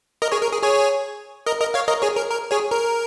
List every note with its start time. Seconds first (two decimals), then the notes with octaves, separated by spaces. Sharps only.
0.22 A#4 D#5
0.32 G#4 C#5
0.43 A#4
0.52 G#4
0.63 G#4 C#5
1.46 A#4 D#5
1.60 A#4 D#5
1.74 C#5 F5
1.88 A#4 D#5
2.02 G#4 C#5
2.16 A#4
2.31 A#4
2.51 G#4 C#5
2.71 A#4